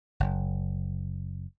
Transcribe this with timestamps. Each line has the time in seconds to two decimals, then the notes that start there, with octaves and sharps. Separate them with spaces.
0.20 F#1